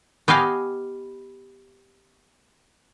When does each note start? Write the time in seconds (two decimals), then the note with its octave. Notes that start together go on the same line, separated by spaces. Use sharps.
0.28 B3 G4 D#5 F5 G#5